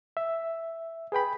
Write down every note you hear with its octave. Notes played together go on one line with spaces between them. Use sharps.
E5
G#4 B4 G5 B5